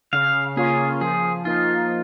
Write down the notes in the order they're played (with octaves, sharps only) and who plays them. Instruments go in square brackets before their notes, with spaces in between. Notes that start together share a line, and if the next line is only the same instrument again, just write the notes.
[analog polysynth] C#3 [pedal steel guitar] F5
[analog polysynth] A#3 C#4 F4 [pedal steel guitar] G#4
[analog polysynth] F3 [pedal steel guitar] G#4
[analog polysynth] A#3 D#4 [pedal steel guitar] F4